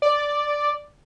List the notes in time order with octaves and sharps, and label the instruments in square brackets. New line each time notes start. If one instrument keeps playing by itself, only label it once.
[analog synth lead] D5